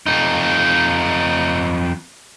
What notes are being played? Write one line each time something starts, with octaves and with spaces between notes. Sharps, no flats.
F2 D#4